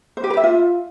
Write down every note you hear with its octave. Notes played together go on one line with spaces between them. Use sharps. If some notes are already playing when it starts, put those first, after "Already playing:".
C5
G4
B4
E5
F4